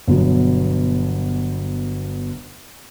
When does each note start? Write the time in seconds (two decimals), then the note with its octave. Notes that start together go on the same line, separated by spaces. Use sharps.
0.08 G1 B2 F#3